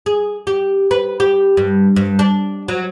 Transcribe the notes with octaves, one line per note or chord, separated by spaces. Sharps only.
G#4
G4
B4
G4
G2
G2
D4
F#3